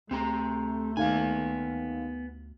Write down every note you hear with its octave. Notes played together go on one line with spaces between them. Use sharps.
D2 A3 C4 G4 A#5
D#2 B3 F5 G#5